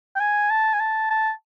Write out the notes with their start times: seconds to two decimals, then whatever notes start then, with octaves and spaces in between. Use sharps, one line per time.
0.16 G5
0.20 G#5
0.50 A5
0.74 G#5
0.80 A5
1.11 A5